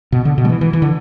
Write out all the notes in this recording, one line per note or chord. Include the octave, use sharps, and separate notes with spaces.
B2
D3
B2
G3
E3
E3
E3
D3